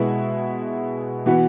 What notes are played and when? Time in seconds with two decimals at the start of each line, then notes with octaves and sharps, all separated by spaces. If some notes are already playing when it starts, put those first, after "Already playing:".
Already playing: B2 G#3 E4 B4 E5
1.26 E3 B3 F#4 B4